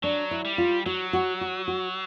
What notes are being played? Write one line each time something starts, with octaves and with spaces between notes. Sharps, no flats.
F#3 D4
E4
G3
F4
F#3 F#4
F#4
F#4
F#4